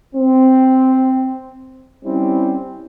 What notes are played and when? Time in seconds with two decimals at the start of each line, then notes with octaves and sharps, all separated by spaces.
0.15 C4
2.05 G3 C4 C#4 E4